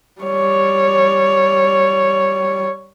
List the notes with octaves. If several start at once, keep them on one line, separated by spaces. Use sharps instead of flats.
G3 C#5